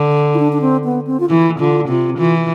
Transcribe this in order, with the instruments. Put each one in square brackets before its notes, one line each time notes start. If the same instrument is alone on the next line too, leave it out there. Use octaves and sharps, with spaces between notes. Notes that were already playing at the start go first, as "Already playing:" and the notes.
Already playing: [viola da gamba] D3
[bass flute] E4
D4
D4
C4
B3
C4
F4
[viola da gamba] E3 [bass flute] E4
[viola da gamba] D3 [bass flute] F4
[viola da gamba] C3 [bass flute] F4
[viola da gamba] E3 [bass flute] F4